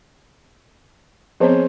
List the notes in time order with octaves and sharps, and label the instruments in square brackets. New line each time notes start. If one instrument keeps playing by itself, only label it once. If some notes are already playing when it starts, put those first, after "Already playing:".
[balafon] F3 B3 C4 [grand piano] G#4 C5 C#5